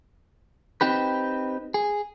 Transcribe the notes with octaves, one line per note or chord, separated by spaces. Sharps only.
C4 D#4 G4 B4
G#4